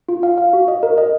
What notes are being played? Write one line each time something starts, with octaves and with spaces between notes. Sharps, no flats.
F4
F5
F5
F#4
D#5
A#4
D#5